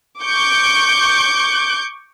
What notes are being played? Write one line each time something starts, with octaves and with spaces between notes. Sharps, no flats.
C#6 D6 G6